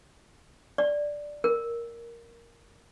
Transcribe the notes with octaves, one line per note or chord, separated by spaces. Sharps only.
D5
A#4